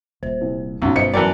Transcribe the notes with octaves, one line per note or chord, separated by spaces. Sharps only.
D#1 C5
C2
B1 F#2 G#3 C4 C#4 D#4
G1 C5 D#5 C#7
F#2 E3 A#4 D5 G5 A5 C#7